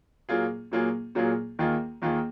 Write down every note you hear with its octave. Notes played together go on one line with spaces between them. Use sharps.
A#2 F#3 A#3 F4 G#4
A#2 F#3 A#3 F4 G#4
A#2 F#3 A#3 F4 G#4
D#2 D#3 A#3 F4 G#4
D#2 D#3 A#3 F4 G#4